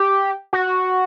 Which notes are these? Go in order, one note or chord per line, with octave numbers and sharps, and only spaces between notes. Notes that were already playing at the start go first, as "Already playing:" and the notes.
Already playing: G4
F#4